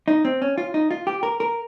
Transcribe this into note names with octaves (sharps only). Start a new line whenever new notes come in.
D#4
C4
C#4
F4
D#4
F4
G4
A#4
A#4